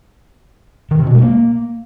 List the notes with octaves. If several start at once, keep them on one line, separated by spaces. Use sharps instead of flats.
D#3
C3
B2
G#3
A#3